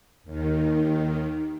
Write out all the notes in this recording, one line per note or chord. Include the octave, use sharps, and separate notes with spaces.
D#2 D#3